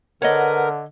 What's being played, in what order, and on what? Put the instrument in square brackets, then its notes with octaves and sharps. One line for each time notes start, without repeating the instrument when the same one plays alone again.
[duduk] D3 [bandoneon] A#4 [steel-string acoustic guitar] B4 F#5 [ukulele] C#5 D#5